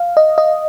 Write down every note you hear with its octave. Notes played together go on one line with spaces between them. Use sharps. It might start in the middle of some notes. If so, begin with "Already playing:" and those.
Already playing: F5
D#5
D#5